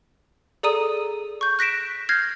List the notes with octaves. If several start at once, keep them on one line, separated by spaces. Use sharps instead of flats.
G#4 A4 D5 A#5 D#6 D#7
C#6 G6
F#6 A#6 B6 D7 E7
F6 G6 G#6 A#6 C7